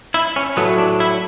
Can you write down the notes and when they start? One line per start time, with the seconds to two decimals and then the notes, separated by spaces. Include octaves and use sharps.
0.14 E4
0.36 C#4
0.57 A2 F#3 A3 B3
0.78 D4
1.00 E4